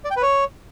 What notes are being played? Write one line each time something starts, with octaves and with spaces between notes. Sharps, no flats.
D5
G5
B4
C#5